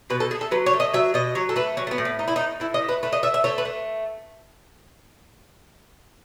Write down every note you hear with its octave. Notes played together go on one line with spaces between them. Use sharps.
B2 B4
A4
A3 G#4
A4
F#3 B4
C#5
A3
D#5
F#3 E5
B2 D#5
F#3 C#5
A4
A3 B4
F#3 C#4
A3
B3
A2
B3
A3 D#4
E4
D#4
A2
A2 E4
D#5
A3
B4
A3 B4
D#5
A3 E5
E5
A3 C#5
B4
A3